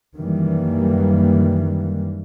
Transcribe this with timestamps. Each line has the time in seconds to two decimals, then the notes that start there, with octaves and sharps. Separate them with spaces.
0.16 F#2 D#3 E3 G3 A#3